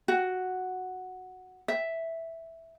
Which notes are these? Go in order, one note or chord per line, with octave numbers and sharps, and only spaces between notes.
F#4
E5